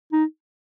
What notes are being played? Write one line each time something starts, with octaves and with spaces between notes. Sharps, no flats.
D#4